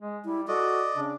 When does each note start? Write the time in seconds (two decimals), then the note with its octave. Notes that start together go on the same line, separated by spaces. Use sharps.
0.01 G#3
0.25 G3 E4
0.48 F#4 A4 D5 D#5
0.95 C#3 D4